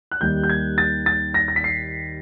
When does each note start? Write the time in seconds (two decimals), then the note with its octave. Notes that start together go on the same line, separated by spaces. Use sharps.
0.11 F#6
0.21 D#2 D#3 G3 G6
0.43 G6
0.49 G#6
0.78 A6
1.06 A6
1.34 A#6
1.48 A#6
1.56 B6
1.64 C7